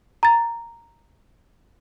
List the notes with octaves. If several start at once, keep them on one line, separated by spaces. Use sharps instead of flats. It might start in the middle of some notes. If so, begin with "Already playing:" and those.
A#5 A6